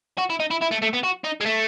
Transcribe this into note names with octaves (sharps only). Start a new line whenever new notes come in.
F#4
E4
D#4
E4
E4
A3
A3
B3
F#4
D#4
G#3
A3